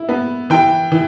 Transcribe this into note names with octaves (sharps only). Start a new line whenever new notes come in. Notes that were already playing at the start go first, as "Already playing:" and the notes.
Already playing: E4
B3
E3 G5
E3